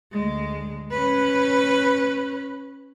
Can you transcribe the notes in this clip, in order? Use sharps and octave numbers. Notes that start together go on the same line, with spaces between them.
D2 G#3
C#4 B4